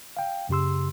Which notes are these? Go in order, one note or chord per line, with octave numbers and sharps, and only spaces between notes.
F5 G5
F#2 C#3 G4 C6 E6